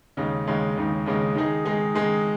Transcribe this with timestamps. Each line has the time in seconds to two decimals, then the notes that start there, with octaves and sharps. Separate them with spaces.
0.17 D#2 C#3 G#3 D#4
0.47 D#2 C#3 G#3 D#4
0.77 D#2 C#3 G#3 D#4
1.06 D#2 C#3 G#3 D#4
1.35 D#3 G#3 D#4 G#4
1.65 D#3 G#3 D#4 G#4
1.95 D#3 G#3 D#4 G#4